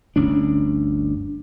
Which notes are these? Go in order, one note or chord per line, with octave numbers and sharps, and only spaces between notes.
G1 D2 C#4 D4